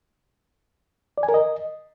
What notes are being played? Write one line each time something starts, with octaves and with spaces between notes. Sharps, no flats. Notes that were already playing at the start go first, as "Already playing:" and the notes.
D5
G#5
A#4
D#5